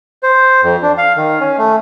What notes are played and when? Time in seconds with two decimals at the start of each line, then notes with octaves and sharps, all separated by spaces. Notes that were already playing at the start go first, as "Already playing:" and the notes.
0.23 C5
0.63 F2
0.83 D4
0.98 F5
1.17 D#3
1.40 C#4
1.58 A3